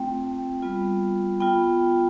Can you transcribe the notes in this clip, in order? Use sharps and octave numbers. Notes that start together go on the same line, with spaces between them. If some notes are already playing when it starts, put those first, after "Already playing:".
Already playing: A3 C4 F4 G5
G3 B3 F4
B3 F4 G5